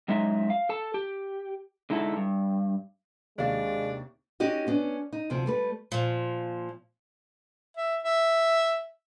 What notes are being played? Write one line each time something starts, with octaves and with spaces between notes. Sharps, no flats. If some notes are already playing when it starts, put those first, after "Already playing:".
F#2 F#3 G#3 D#4 E5
F5
A4 A5
G4
D3 G#3 D#4 E4 F#4 A4
G2
D#2 C3 G#3 D4 D5 F5 A6
C#4 D#4 F#4 G4 D#5
B3 C#4 D4
D#4
D2 C3 F3 C4
G3 A3 B4
A#2 F3
E5
E5